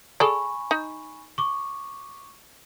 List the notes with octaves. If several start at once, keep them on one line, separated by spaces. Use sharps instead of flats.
G#4 A4 D5 G#5 B5 C#6
D#4
C#6 D6